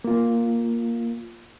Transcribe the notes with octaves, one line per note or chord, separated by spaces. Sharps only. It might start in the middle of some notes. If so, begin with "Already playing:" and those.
A#3 F4